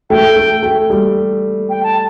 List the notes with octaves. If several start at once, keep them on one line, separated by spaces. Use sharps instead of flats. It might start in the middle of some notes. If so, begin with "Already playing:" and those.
A3 G5
A3
A3
G3
G5
A5